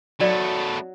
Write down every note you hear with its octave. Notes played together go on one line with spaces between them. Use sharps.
F#3 A3 B3 D#4 D5